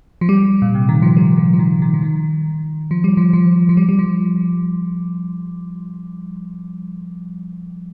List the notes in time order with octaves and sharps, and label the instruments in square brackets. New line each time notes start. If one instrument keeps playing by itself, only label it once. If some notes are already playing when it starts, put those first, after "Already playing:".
[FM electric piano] F3
G3
A#2
C3
D#3
F3
G3
F3
F3
D#3
D#3
F3
D#3
F3
G3
F3
F3
F3
G3
G3
F3